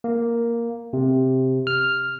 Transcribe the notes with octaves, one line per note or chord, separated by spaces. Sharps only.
A#3
C3
F6